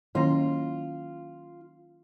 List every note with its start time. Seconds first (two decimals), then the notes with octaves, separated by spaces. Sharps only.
0.15 D#3 F#3 A#3 C#4 E4 F4